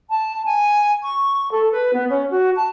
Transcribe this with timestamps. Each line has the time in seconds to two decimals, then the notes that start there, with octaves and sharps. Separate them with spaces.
0.10 A5
0.45 G#5
1.03 C#6
1.51 A4
1.72 B4
1.93 B3
2.10 C#4
2.30 F#4
2.56 A5